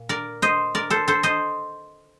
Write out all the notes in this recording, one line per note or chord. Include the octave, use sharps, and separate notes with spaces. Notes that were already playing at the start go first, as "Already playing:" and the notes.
Already playing: A#2
A#4 D5
C5 D#5
A#4 D5
A4 C5
A4 C5
C5 D#5